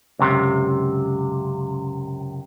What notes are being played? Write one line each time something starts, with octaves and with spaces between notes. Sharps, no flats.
C#2 F#2 C3